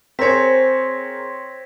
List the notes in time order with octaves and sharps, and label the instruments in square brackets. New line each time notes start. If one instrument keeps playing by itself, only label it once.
[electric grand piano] C4 C#5 [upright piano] G#4 A#4 [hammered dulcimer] C5 [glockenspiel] G#6 A#6 B6